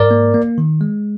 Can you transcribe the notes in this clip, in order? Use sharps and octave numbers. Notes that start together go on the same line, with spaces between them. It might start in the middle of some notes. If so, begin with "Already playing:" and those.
Already playing: G#2 A#4 D5
A#3
A#3
D#3
G#3